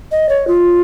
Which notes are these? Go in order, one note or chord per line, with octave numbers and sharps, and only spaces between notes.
D#5
C#5
F4